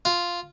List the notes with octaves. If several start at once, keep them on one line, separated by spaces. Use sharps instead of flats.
F4